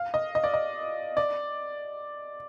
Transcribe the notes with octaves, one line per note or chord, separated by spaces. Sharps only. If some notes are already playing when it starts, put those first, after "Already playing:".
Already playing: F5
D#5
D#5
D5
D#5
D5